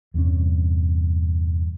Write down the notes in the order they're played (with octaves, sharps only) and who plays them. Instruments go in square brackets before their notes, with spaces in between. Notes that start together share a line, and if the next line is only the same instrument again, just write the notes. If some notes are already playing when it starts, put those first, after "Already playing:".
[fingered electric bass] E2 G2 C3 C#4